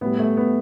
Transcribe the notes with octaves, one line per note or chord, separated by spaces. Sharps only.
A2 G3 B3
A3
B3